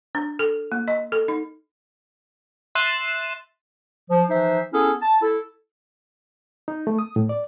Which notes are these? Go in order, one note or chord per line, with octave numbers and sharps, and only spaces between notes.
D4
A4
A#3
D#5
A4
D#4
E5 C6 F#6 A6 D#7 E7
F3
E3 F3 D#4 C5 E5
B3 C#4 E4 G#4 A4
A5
E4 A4
D#4
A3
D#6
A2
D5